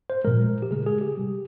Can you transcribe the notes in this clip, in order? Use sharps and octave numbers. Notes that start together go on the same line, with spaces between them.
C5
A#2 F3 G#3 A#4
G4
C#3 G#3 G#4
G#4
G4
C3 G3